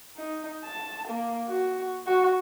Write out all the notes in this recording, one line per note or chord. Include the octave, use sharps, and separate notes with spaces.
D#4
A5
A#3
F#4
F#4